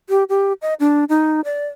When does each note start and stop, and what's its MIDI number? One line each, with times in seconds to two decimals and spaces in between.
0.09 0.24 67
0.29 0.53 67
0.62 0.74 75
0.80 1.04 62
1.09 1.41 63
1.45 1.66 74